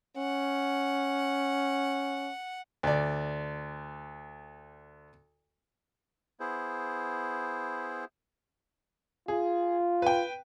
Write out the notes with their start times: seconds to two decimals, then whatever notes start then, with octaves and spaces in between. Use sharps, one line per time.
0.17 C#4 F#5
2.83 D2 D5
6.40 B3 E4 G#4 C5
9.28 F4 G#4
10.02 B4 G5